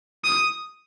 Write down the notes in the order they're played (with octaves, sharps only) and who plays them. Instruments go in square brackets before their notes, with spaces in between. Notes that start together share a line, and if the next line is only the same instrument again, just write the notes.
[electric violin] D#6